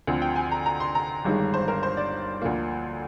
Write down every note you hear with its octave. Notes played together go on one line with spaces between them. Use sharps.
D2 D3 F3 C4
G5
G#5
A#5
A#5
C6
A#5
G1 G2 D#3 G#3
C5
A#4
C5
D5
D2 D3 F3 A#3